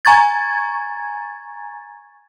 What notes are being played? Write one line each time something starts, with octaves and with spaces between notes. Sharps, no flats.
G#5 A#5 C#6 G#6 A6